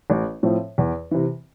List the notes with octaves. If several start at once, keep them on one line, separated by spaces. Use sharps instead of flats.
A1
A2 F3 C4
E2
C3 E3